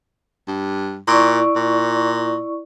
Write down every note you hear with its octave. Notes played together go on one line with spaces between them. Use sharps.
G2
A#2 E4 D5 C#6
A#2